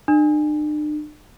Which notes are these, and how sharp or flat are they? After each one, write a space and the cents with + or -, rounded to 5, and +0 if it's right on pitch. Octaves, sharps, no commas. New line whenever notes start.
D4 +45